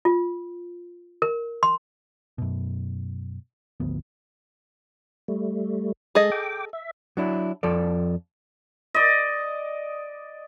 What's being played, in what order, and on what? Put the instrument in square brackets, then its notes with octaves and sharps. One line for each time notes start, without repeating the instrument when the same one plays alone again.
[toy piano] F4
A#4
C6
[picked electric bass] F#2 B2
G#1 D2 F3 B3
[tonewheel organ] G3 A3
[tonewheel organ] G#3 [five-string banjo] G#4 A4 D#5
[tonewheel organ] G5 D6
E5
[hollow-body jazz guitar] F#3 D4 E4
F2 F3 A4 D5
[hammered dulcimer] D5 D#5